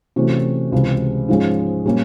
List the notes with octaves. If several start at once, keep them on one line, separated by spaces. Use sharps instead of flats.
C3 E3 A3 C#4 F#4
C#2 C3 E3 G#3
G#2 F3 G#3 C#4
A#2 G3 A#3 C#4